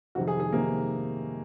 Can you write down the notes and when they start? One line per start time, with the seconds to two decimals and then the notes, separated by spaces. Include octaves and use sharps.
0.15 F2 C3 D#3 F#4
0.28 G#4
0.40 G#4
0.52 C3 D#3 A#3